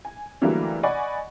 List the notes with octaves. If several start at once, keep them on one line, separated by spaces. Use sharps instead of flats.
G#5
D3 E3 F#3 G3 A3 A#3
D5 D#5 F#5 G#5 B5 C#6